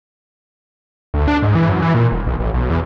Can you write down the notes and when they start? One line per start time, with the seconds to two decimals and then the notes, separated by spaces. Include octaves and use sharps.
1.14 D2
1.28 D4
1.42 G#2
1.55 E3
1.69 F#2
1.82 E3
1.94 A#2
2.12 D#1
2.27 B1
2.40 A1
2.54 B1
2.70 E2